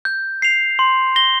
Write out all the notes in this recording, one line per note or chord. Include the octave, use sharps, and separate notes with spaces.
G6
C7 F7
C6
A#6 G7